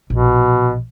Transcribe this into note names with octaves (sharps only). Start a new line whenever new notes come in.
A#1 B2